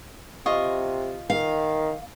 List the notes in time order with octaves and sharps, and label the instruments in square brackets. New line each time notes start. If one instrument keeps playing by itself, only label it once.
[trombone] C3 [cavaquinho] F4 D#5 C#6
[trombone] D#3 [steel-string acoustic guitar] F5